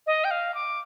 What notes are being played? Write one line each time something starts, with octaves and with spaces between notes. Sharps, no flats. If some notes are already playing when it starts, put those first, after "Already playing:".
D#5
G5
F5
D6